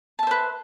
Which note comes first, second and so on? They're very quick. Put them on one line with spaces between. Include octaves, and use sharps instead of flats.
A5 E5 C5 B4